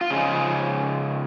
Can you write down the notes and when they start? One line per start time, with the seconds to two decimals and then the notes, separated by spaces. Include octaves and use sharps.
0.01 F4
0.10 C#3 F3 G#3 G#4